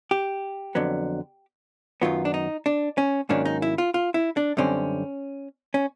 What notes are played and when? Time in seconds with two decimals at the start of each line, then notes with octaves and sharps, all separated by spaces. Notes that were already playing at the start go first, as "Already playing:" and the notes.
0.11 G4
0.75 F2 D3 F#3 B3
2.02 F#2 D#3 F#3 B3 F4
2.25 D4
2.34 D#4
2.66 D4
2.98 C#4
3.29 G#2 D#3 F#3 A#3 C#4 D4
3.45 D#4
3.62 E4
3.78 F4
3.94 F4
4.14 E4
4.37 D4
4.57 F#2 D3 G3 C4 C#4
5.74 C#4